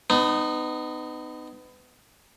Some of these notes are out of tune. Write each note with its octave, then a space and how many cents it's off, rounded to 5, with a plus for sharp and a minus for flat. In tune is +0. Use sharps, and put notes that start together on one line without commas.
B3 +30 D#4 -20